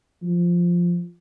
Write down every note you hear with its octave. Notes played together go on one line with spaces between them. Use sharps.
F3